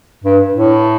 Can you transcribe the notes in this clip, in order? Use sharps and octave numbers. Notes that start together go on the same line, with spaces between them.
G2
A2